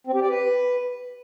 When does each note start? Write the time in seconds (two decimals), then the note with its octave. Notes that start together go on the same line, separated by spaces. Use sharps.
0.07 C4
0.14 G4
0.21 D5
0.29 B4